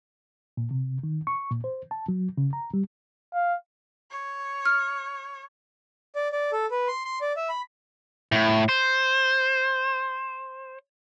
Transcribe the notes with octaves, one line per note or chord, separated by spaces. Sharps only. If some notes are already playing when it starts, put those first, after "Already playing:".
A#2
C3
D#3
C#6
A#2
C5
A5
F#3
C#3
A#5
G3
F5
C#5
F6
D5
D5
A4
B4
C6
C6
D5
E5
B5
A2
C5